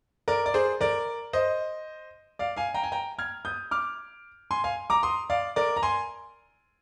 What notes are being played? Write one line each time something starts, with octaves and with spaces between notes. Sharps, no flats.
A#4 D5
D5
G#4 C5
A#4 D5
C5 D#5
D5 F5
F5 G#5
G5 A#5
G#5
G5 A#5
F6 G#6
D#6 G6
D6 F6
G#5 C6
F5 G#5
A#5 D6
C6 D#6
D5 F5
A#4 D5
A#5
G#5 C6